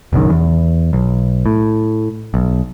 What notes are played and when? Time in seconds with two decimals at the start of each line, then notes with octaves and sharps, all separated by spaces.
0.13 F#1 B1 F#2 D#3
0.30 E2
0.93 B1
1.46 A2
2.34 B1